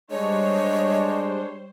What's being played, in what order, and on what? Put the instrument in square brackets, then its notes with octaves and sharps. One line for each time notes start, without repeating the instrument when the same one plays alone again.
[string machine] G3 C5 [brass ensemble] G#3 D4 [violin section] C#5 [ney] D#5